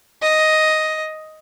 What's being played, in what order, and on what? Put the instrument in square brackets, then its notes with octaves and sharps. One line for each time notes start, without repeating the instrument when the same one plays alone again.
[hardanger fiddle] D#5